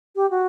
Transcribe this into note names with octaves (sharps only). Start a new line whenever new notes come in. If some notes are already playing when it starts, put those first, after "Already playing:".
G4
F#4